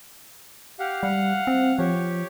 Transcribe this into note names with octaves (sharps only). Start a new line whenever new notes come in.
G4 F5 F#5
G3 F5 F#5
C4
F3 G4 C#5